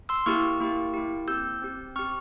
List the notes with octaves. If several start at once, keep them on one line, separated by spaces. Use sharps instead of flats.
C6 E6
A#3 E4 G4 C#6 F6
A#3 E4 G4
A#3 E4 G4
C4 G4 E6 G6
C4 G4
C4 G4 C#6 F6